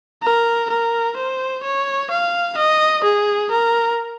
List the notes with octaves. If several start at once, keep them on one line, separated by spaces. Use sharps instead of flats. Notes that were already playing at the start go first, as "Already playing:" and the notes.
A#4
A#4
C5
C#5
F5
D#5
G#4
A#4